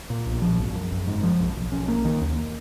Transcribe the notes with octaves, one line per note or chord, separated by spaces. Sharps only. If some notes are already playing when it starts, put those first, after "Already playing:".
A#2
B1
F3
G#1
F#2
F#1
G#2
F3
B1
B1
C#4
A#3
D#3
D#2